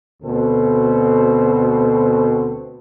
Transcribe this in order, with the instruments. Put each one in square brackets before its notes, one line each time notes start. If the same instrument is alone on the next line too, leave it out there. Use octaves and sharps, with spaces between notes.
[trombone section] D2 B2 C4 A4